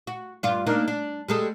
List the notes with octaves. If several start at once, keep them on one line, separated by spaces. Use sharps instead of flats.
F#4
G2 F4
A#3 D4 D#4
D4
G3 G#3 A4